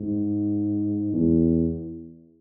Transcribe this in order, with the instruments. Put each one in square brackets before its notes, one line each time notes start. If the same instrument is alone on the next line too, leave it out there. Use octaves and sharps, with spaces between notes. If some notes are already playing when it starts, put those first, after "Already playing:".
Already playing: [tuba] G#2
E2